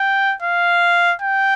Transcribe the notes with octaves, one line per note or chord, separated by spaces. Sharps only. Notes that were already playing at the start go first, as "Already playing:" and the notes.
Already playing: G5
F5
G5